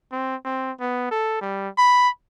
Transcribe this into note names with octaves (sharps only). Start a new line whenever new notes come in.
C4
C4
B3
A4
G3
B5